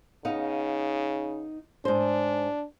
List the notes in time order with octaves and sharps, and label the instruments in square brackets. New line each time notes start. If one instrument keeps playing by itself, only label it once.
[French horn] C#3 [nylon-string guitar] B3 D#4 F5
[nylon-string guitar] G#2 C5 [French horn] D4